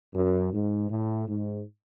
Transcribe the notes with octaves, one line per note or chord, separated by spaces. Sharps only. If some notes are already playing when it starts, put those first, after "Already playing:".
F#2
G#2
A2
G#2